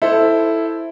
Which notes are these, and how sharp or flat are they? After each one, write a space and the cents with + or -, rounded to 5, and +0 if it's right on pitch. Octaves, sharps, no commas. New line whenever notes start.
E4 +0 A4 +0 C5 +0